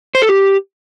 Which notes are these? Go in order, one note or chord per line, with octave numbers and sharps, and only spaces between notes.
C5
A4
G4